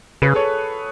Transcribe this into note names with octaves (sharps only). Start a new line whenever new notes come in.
C#3 G#4 B4
A4 C#5